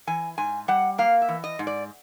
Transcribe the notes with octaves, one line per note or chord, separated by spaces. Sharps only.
E3 G#5
G#2 G#5
G3 F#5
A#3 F5
E5
E3
D#5
G#2
D5